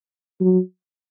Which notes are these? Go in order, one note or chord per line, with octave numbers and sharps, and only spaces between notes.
F#3